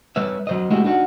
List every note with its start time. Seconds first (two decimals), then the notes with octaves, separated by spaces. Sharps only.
0.16 G3 B4 C#5 E5
0.47 F#3 C5 D#5
0.71 G#3 A3 C#4 E4 F#4 G4
0.84 D4 D#4 F#4 C5 F#5